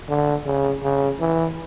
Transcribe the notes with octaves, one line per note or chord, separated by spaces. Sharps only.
D3
C#3
C#3
E3